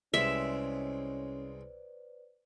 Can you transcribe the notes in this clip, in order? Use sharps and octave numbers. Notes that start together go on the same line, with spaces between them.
C2 G#3 C4 C#4 B4 C5 D5 E5